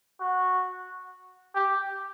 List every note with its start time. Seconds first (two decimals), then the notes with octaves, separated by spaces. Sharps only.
0.20 F#4
1.55 G4